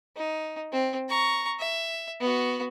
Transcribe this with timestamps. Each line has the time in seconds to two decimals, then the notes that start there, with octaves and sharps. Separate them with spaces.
0.16 D#4
0.72 C4
1.09 A#5 C#6
1.59 E5
2.21 B3 F#4